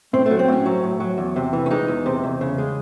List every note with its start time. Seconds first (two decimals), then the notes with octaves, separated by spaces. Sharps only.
0.13 A2 C4
0.26 A3
0.31 F#3
0.39 C4
0.48 A2 C#4
0.66 F#3
0.84 A2
1.00 F#3
1.18 E2
1.36 C3
1.53 E3
1.66 C#4
1.71 G#3 D#4
1.88 E2
2.06 C3
2.24 E2
2.41 C#3
2.58 G#3